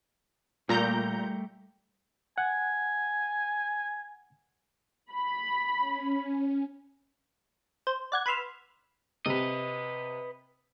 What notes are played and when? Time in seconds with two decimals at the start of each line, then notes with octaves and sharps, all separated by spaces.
0.69 A#2 G3 A3 G4 A#5 G6
2.38 F#5 G#5
5.11 B5
5.76 C#4
7.87 C5
8.12 D5 F#5 G#6
8.26 B4 B5 C6 E6 F6
9.26 C3 B4 D#5